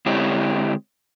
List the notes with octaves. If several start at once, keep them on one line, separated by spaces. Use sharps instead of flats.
D3 G#3 C4 E4 G4 C#5